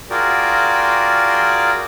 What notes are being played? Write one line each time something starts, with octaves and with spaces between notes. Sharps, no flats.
F4 F#4 G#4 A#4 D5 G5